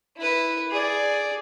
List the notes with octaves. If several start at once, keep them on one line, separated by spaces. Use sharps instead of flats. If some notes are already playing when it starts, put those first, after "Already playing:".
E4 B4
G#4 D5